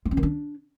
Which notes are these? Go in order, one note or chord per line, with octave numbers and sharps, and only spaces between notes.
G#3
C#4
D#3
D4